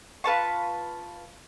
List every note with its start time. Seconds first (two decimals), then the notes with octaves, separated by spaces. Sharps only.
0.24 F4 B4 A5 C#6